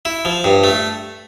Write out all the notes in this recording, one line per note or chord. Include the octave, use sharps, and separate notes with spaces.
E4
F3
G2
A3